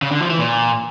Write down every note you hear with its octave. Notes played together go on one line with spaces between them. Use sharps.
C#3
D3
F3
E3
A#2